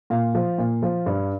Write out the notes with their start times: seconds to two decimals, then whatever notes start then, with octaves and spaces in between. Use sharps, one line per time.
0.10 A#2 F5
0.35 F3
0.58 A#2
0.82 F3
1.06 G2